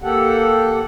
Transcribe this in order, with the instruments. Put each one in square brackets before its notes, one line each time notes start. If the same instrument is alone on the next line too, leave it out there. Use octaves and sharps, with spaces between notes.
[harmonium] A#3 G4 A4 F#5